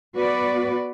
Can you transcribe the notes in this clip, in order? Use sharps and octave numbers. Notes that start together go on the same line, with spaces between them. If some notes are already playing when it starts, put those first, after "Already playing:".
B3 F#4 B4 D5